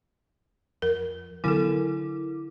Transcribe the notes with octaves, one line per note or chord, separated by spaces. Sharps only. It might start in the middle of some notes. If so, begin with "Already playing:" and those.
F2 A#4
D3 F#3 B3 E4 A4 A#4 D6